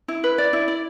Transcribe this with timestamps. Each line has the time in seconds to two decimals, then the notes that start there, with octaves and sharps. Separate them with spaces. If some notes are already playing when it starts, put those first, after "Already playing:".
0.08 E4
0.24 B4
0.38 D5
0.53 E4
0.68 D5